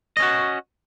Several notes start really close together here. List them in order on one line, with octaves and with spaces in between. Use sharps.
D#5 C#4 F#4